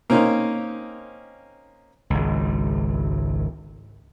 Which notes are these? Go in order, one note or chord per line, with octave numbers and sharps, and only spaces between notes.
A#3 C4 C#4 D#4
G#1 C#2